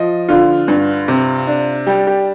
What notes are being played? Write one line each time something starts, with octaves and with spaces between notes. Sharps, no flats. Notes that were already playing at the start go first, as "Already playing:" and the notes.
Already playing: F3 D#5
D3 F4
G2
C3
D4
G3 G4
G4